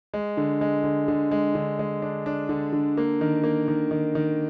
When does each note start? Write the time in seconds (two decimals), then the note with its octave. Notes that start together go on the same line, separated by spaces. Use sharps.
0.14 G#3
0.37 D3
0.61 G#3
0.84 D3
1.08 D3
1.31 G#3
1.55 D3
1.79 G#3
2.02 D4
2.26 D4
2.49 D3
2.73 D3
2.97 A#3
3.21 D#3
3.44 A#3
3.68 D#3
3.91 D#3
4.15 D#3